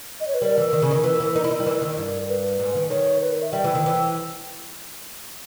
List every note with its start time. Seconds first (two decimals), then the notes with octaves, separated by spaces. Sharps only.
0.20 D#5
0.27 C#5
0.34 B4
0.41 G3 A#4
0.57 E3
0.73 D#3
0.82 C#3
0.91 D#3
1.03 E3 B4
1.14 A#4
1.20 E3
1.35 D#4 A#4
1.44 E4
1.51 D#4
1.60 G3
1.66 E3
1.82 D#3
1.97 G2
2.29 B4
2.60 G#2
2.75 D#3
2.90 D#3 C#5
3.21 B4
3.32 A#4
3.42 E5
3.53 G3 G5
3.64 E3
3.75 D#3
3.86 E3